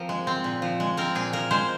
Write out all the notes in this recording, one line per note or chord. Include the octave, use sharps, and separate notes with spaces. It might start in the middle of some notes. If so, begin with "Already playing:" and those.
Already playing: F3 C4 A#4
G#3
C4
A#2
F3
G#3
C4 A#4
A#2 G#4
F3 A#4
G#3 C5